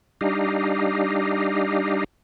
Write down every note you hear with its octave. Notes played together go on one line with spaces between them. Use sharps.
G3 D4 D#4 G4 D#5 F5